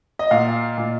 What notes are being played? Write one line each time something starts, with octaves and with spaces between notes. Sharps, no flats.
D#5
A#2 F5
A#2